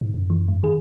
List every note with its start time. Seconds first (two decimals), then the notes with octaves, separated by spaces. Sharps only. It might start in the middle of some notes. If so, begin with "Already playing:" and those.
0.01 G#2
0.14 F#2
0.30 E3
0.48 G#2
0.63 D#3 G#4